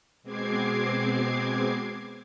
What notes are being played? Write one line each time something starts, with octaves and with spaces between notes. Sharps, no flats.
B2 G#3 C4 D6 G#6 C7